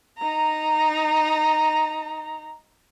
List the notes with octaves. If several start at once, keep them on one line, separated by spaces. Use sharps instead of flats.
D#4 A#5